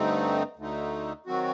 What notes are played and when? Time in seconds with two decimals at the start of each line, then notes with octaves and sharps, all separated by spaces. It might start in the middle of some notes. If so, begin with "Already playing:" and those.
Already playing: G2 D3 A3 C4 D#4
0.57 D2 D3 A3 D#4
1.26 D#3 F#3 C4 F#4